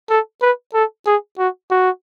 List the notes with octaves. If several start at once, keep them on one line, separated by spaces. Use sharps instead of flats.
A4
B4
A4
G#4
F#4
F#4